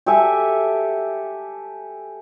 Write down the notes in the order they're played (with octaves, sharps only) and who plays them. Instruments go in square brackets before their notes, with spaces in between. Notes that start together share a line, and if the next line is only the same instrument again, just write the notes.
[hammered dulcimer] G4 A4 E5 G#5